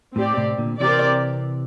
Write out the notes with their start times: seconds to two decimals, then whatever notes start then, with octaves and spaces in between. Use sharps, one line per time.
0.15 A2 C4 G4 D5
0.37 A2 C3
0.58 A#2 D3
0.80 C3 E3 C4 G4 A#4 D5